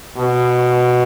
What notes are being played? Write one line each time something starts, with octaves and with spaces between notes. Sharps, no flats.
B2